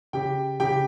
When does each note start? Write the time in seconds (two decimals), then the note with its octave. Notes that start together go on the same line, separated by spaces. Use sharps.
0.13 C#3 G4 G5
0.60 C#3 G4 G5